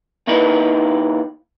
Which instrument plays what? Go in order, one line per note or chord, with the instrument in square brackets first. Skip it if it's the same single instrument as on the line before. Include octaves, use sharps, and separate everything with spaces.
[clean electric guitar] D#2 D#3 D#4 E4 B4